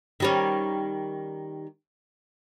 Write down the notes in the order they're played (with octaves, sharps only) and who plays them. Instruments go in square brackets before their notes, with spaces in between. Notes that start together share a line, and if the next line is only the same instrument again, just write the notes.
[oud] D#3 G3 C#4